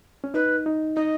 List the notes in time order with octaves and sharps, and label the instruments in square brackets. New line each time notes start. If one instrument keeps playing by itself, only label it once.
[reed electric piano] C#4
[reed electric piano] D#4 [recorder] B4
[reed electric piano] D#4
[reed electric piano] D#4 [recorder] D#5